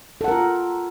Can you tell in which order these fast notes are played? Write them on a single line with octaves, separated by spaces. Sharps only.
A4 F#5 A#4 F4